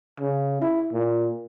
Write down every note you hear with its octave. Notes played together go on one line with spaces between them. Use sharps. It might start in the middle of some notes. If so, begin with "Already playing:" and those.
C#3
E4
A#2